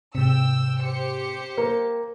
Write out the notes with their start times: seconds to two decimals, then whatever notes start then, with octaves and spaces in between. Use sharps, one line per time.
0.15 G#2 C3 G5 E6
0.82 G4 C5 C#7
1.57 A#3